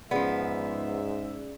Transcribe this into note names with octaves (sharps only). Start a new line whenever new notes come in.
G#2 F3 B3 C#4 G#4 D5 E5